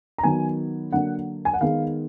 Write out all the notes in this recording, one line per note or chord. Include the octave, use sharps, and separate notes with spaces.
A#5
D#3 F#3 B3 G#5
D3 F#3 A#3 F#5
G#5
F#5
D#3 G#3 B3 F5